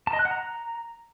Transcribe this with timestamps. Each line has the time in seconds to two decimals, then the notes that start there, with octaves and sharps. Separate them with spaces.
0.07 A5
0.13 D#5
0.19 F#6
0.25 F#5
0.31 A#5